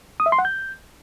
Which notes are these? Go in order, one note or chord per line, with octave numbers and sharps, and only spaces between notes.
D#6
E5
C6
F#5
G6